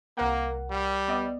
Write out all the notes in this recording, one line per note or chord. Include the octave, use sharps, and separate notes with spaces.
C2 A#3 A#4 F#5
G3
B3 D5 D#5